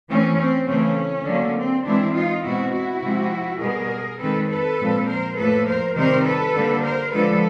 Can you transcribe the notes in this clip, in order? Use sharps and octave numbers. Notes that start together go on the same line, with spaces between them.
E3 A3 C4 C#4
C4
C#3 E3 A3 C4 C#4
D3 F#3 A#3
C4
E3 G#3 C4 D4 E4
D#4 F4
B2 G#3 C4 E4 F#4
E4 F#4
C3 F3 G#3 C4
B2 G3 B3 G#4 A#4
D#3 G#3 C4 A4 B4
A4 B4
A#2 F3 G#3 C4
A#4 C5
A2 F3 A#3 A4 B4
A#4 C5
C3 D#3 G3 C4 A#4 C5
A4 B4
D3 G3 A#3
A#4 C5
D3 F3 G#3 A4 B4